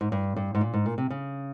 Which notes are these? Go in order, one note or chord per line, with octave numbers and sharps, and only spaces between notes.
G#2
G2
G2
G#2
A#2
G#2
A#2
C3
C#3